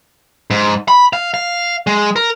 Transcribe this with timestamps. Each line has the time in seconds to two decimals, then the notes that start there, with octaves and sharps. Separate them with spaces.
0.50 G#2
0.88 B5
1.13 F5
1.34 F5
1.87 G#3
2.16 A#4